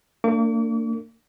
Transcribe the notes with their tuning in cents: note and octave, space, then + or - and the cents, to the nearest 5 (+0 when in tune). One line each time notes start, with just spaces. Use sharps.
A#3 -40 D4 +0 D6 -40